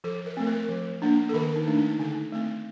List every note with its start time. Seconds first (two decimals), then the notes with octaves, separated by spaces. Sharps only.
0.04 F3 A4
0.26 A#4
0.37 A3 C4
0.47 A#4
0.69 F3
1.02 A#3 D4
1.29 A4
1.34 D#3 A#4
1.56 D#4
1.67 A3 D4
1.78 D#4
1.99 D3 D#4
2.32 A3 C4